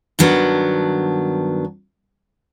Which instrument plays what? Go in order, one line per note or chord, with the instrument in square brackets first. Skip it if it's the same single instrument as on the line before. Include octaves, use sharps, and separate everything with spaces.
[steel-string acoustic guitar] G2 D#3 F#3 B3 D4